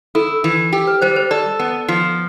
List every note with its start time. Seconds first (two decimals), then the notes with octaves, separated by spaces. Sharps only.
0.15 E4 A4
0.44 E3
0.73 G4
0.87 B4
1.02 G3 C5
1.16 C5
1.31 A4 D5
1.60 B3
1.88 F3